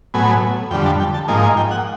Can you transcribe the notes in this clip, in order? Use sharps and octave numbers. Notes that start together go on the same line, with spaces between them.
A2 F#3 B3 G#5
F2 D3 G3 G5
A5
G5
A5
G#2 F3 A#3 D#4 G#5
G#5
G5
F#5